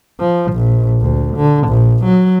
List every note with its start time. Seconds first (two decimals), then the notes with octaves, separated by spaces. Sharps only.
0.20 F3
0.52 A#1
1.01 D2
1.37 D3
1.68 A#1
2.05 F#3